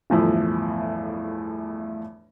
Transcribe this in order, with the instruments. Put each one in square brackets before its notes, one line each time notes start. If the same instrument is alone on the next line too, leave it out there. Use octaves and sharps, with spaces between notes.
[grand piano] G1 E2 A2 F3 E4